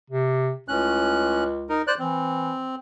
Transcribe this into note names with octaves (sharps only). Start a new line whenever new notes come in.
C3
C#2 A2 C#4 F#6
D#4 A#4
C5 D5 F#6
E3 C4